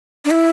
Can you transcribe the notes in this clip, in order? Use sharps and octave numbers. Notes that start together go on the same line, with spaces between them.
D4
E4